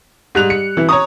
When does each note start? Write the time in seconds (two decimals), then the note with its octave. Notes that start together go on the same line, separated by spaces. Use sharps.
0.35 G#2 G3 F#6 F7
0.50 C#7
0.77 E3
0.89 C#5 A#5 C#6 D#6